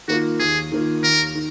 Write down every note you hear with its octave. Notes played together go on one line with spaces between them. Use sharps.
D#3 A#3 F4 F#4
D#2 G#4
D#3 A#3 F4
D#2 A#4
D#3